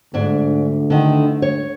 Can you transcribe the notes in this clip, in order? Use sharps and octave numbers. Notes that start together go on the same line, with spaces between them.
D2 G#2 D4
D3 D#3
C#5